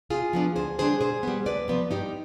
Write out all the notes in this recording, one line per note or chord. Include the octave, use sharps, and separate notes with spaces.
C3 F4 G#4
F3 B3 D4
D2 G#4 C5
D3 G3 D4 G#4 C5
B2 G#4 C5
G3 B3
D2 B4 D5
C3 F3 B3
G2 D#4 G4